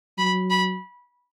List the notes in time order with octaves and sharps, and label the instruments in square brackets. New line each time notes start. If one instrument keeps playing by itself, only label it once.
[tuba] F#3 [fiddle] B5
[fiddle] B5